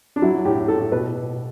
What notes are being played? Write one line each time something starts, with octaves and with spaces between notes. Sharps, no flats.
D4
F#3 E4
A2 G4
A2 A4
B2 B4